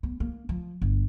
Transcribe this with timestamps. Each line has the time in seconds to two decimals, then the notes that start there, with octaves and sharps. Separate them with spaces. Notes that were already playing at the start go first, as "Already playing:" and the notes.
0.03 B3
0.20 A#3
0.49 F3
0.82 G1